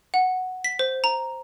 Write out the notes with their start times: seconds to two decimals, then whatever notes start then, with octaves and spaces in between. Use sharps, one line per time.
0.14 F#5
0.64 B6
0.79 C5
1.04 A#5